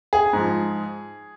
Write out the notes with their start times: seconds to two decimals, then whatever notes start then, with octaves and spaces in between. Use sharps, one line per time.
0.13 G#4
0.33 G#2 F3